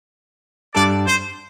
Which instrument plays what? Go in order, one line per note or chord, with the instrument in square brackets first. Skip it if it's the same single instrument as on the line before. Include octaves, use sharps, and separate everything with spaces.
[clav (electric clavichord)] G2 G3 D4 A4 [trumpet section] D5
[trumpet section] C5